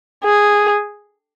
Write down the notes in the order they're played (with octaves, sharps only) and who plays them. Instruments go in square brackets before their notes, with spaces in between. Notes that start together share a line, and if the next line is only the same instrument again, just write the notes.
[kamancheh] G#4